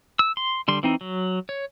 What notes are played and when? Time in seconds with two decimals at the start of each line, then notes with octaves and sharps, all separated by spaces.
0.19 E6
0.37 C6
0.68 D3 G3 C6
0.83 E3 C4 D#4
1.01 F#3
1.49 C#5